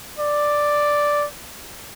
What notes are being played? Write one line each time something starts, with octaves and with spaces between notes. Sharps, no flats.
D5